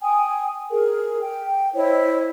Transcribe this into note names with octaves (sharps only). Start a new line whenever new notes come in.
G5 G#5 D#6
G#4 A#4
G5
E4 C5 C#5 D#5